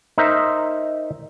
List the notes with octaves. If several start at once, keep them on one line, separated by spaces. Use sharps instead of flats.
D#4 A#4 C5 E5